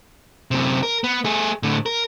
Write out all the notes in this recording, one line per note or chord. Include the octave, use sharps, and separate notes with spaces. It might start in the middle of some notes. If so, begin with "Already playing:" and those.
F#2 C3
A#4
B3
A3 G#4
A2 D3
A#4